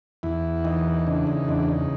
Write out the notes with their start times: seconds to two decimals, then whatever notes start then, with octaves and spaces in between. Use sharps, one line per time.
0.23 E2 E4
0.64 E3 D#4
1.07 C#3 D4
1.27 D#4
1.48 E2 D4
1.69 D#4